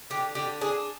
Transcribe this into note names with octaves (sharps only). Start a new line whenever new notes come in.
D3 G4
D3 G4
D4 G#4